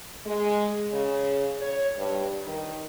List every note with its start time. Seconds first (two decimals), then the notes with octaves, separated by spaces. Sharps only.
0.25 G#3
0.92 C#3
1.59 C#5
1.97 G2
2.45 D#3